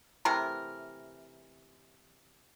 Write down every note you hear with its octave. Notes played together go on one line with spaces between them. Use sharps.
C3 E3 A3 A#4